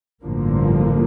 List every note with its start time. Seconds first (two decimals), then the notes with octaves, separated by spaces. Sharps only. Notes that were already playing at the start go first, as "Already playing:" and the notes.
0.23 A1 G2 D3 F3 A#3